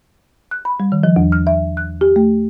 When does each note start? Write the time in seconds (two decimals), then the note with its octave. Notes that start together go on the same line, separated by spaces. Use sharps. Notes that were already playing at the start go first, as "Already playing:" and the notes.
0.51 F#6
0.65 B5
0.80 G3
0.92 D#3
1.03 F3
1.16 E2
1.32 F6
1.47 E5
1.77 F#6
2.01 G4
2.16 A3